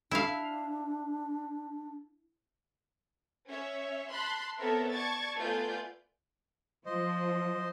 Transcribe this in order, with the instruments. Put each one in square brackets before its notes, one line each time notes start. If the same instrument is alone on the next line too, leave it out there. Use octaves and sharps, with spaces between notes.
[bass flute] D4 [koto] E4 F5
[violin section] C#4 C#5 E5
A5 B5 C6 F#6
B3 C4 A4 A#4 C#5 E5
D5 A5 C#6 G#6 A6
A3 B3 F4 D5 G#5 G6
[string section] F3 [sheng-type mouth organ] C5 D#5